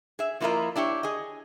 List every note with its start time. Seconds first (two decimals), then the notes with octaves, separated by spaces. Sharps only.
0.19 G#4 E5
0.40 F3 A#3 E4 F4 A#4 D#5
0.76 D4 E4 G4 C#5
1.03 G#4 D#5